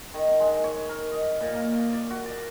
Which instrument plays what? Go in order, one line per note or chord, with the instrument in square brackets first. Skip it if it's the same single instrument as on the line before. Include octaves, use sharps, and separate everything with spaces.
[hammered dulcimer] D#3
G#3
C#5
A#4
D#5
A#2
A#3
D5
F#4
D5